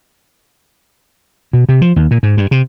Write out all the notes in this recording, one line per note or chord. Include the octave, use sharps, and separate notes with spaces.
B2
C3
F3
D#2
A#2
G#2
G2
C3